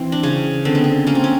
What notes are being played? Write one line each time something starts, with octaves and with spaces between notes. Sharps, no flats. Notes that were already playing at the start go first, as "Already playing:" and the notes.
Already playing: E3 C4
D4
C#3 C#4
D3 C4
B3
C4
A#3 C#4
C4
C#4